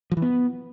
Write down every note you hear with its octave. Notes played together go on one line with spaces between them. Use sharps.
F3
E3
B3